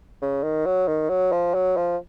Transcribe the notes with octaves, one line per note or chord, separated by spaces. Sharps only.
C#3
D#3
F#3
D#3
F#3
F3
F#3
F3